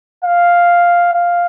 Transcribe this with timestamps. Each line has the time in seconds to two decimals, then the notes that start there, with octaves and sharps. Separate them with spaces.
0.24 F5
1.14 F5